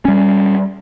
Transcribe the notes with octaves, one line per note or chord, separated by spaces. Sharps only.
G3 C#4